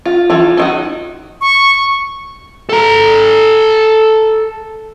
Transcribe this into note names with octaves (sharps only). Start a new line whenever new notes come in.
F4
E3 F4
D#4 E4 F#4
C#6
A4 A#5